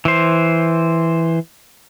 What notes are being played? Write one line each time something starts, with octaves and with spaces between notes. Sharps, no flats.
E3 C5